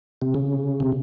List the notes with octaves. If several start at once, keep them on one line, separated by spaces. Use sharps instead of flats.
C3
C#3
C3